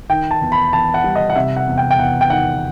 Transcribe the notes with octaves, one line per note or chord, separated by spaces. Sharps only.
D#3 G5
A5
E2
B5
E2 A5
F#5
G3
D#5
F#5
C3 E5
F#5
E2
G5
G5
E2 F#5
G5
D#3 F#5